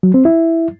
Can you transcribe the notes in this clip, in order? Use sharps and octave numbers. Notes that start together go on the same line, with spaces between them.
F#3
C4
E4